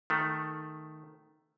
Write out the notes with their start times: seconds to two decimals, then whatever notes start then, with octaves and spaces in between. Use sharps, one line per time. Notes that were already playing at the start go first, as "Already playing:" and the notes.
0.10 D#3 A3